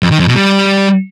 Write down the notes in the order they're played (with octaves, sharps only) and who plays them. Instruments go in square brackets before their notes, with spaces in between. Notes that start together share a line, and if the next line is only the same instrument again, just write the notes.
[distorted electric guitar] F2
D#3
F2
B2
G3